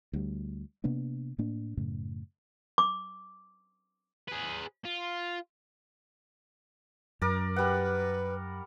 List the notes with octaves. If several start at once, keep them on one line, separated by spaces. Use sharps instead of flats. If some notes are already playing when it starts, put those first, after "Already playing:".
D2 G3
C3 A#3 B3 D4
A2 A#3 D4
F#2 A2 C#3
D6
G#4 B4
F4
F#2 A#4 D5
G3 B4 F#5